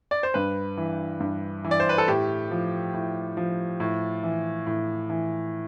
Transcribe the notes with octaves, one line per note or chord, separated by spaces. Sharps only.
D5
C5
G2 B4
E3
G2
E3
D5
C5
B4
A4
A2 G4
F3
A2
F3
A2
E3
A2
E3